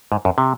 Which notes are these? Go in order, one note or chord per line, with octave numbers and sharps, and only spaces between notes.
G#2
F#2
C3